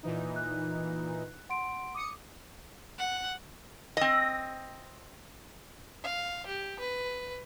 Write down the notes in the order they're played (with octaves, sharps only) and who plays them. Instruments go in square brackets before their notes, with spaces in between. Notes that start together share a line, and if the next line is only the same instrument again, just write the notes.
[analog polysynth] A#2 E3 D#4
[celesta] F#6
F#5 C6 D7
[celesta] D6 [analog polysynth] D#6 C#7
[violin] F#5
[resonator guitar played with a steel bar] C4 D#5
[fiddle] F5
G4
B4